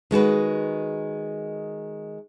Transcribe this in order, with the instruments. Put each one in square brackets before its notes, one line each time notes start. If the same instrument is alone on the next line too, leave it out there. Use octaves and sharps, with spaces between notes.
[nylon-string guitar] D#3 G#3 F#4 B4